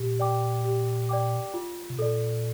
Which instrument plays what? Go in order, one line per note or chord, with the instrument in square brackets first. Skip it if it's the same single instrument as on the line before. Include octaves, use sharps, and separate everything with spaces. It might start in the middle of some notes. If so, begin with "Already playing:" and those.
Already playing: [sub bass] A#2 [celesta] G4
[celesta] D5 G5 D6
G4
D5 G5 D6
F4
[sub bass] C3
[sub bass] A#2 [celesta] A4 D5